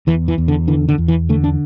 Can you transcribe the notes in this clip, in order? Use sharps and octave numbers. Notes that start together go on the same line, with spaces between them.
E2 E3
E3
E2
D3
D3 E3
D3
E2
E3
D3 A3
D4